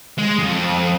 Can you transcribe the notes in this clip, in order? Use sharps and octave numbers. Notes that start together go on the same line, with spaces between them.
G#3
F2